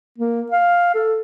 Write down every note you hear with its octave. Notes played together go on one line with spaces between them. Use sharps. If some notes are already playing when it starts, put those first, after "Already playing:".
A#3
F5
A4